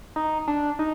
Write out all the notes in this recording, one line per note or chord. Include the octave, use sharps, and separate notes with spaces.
D#4
D4
D#4